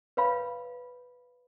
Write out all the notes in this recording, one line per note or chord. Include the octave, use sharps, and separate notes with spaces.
B4 C#5 F5 B5